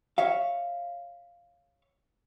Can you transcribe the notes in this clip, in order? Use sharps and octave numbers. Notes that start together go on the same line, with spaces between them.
C#5 E5 F5